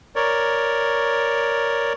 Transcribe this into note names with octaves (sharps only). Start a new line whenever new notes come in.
A#4 C#5 D5